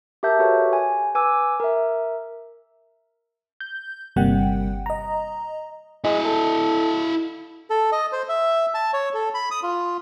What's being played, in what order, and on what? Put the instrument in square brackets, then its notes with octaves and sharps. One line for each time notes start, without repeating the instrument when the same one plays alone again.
[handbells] G4 A#4 E5 A5 G6
F#4 G4 A4 B4 C#5 E5
G#5
B4 G#5 D6 E6
A#4 E5
[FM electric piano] G6
G1 C3 G3 A#3 F#5 G5
D#5 A#5
[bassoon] G#3 [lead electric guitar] E4 D#5
[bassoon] A4
[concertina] A4
D#5
C5
E5
A5
C#5
A4
B5
D#6
F4